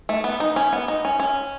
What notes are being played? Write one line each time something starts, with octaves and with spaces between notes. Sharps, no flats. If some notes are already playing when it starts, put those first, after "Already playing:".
A3
B3
D#4
C#4
B3
D#4
C#4
C#4